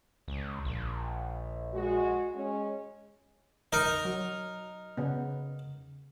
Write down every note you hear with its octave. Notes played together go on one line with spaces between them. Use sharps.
C#2
A#1
G#3 F#4
G#3 C#4
D#4 A#4
F#3
C#3 B3